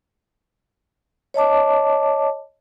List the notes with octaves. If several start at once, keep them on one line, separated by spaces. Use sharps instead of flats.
C#5 D#5 A5 D6